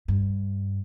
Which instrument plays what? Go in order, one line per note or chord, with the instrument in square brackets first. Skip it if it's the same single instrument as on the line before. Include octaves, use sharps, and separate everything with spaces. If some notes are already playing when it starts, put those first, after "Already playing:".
[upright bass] G2